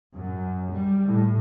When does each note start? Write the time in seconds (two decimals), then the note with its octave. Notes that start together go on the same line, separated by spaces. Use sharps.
0.15 F#2
0.72 G3
1.06 A2